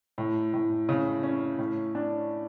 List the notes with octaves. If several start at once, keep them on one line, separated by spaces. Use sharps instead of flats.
A2
A2
C#3
C#4
A2
D4